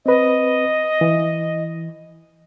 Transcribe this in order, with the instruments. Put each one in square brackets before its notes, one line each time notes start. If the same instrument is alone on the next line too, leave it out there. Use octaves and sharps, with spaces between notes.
[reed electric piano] C4 B4 [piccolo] D#5
[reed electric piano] E3